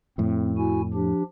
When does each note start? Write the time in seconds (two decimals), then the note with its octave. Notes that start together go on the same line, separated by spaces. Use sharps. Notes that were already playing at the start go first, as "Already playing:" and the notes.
0.18 F2 A2 C4
0.57 E4 F#4 G#5
0.94 F3 D4 G4